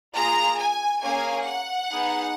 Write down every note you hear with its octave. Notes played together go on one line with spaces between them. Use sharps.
A#3 F4 G#4 A#5
G#5
A#3 C#4 G#4 G#5
F#5
B3 D#4 G#4